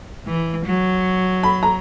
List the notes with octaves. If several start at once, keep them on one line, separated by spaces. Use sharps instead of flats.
E3
F#3
B5
A#5